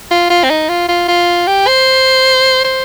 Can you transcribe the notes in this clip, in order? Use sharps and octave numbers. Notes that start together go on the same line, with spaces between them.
F4
F4
C4
D#4
F4
F4
F4
G4
C5
C5